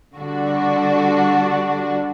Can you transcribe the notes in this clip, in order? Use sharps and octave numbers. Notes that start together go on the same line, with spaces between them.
D3 G3 D4 F#4